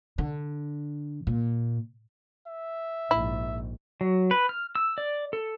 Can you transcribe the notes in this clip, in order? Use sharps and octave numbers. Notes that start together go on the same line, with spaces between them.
D3
A#2
E5
A#1 G#2 E4
F#3
B4
F6
E6
D5
A4